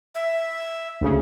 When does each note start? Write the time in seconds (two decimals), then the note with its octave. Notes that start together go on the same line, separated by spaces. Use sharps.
0.15 E5
1.01 D2 C#3